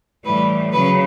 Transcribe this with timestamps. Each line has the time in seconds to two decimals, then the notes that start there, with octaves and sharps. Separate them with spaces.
0.25 A2 E3 G3 B4
0.73 C#3 F#3 B4